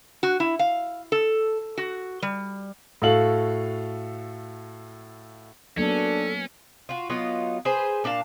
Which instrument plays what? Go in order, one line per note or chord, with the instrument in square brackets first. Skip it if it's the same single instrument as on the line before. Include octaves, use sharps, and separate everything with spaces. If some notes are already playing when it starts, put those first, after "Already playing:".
[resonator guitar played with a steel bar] F#4
E4
F5
A4
F#4
G3
[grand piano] A2 F#4 A4 F5 F#7
[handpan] F#3 A#3 B3 [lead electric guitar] C#4 [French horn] D4 [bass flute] A4
[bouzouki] F4 F#4
F#3 B3 D#4 F4
G#4 B4 C5
A#2 D4 F5 A5